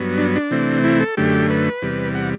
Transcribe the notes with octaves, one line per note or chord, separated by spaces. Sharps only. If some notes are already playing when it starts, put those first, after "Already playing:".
Already playing: G2 F#3 B3
D4
D4
C3 E3 A3 C4
E4
A4
F#2 D3 A3 G4
B4
E2 C3 G3
F#5